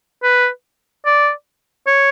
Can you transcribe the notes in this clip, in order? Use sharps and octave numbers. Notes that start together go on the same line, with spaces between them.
B4
D5
C#5